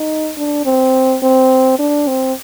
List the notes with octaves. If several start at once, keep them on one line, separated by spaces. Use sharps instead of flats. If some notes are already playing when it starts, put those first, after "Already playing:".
Already playing: D#4
D4
C4
C4
D4
C4